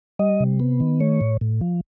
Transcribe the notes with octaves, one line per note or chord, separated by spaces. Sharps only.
G3 D#5
C3
B3
D#3
A3 C#5
A2
A2
F3